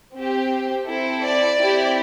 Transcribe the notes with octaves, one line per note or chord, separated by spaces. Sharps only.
C4 G4
C4 E4 A4
D5
C4 E4 G4